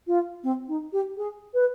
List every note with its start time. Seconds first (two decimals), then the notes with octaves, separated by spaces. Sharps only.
0.07 F4
0.43 C4
0.68 D#4
0.92 G4
1.17 G#4
1.54 B4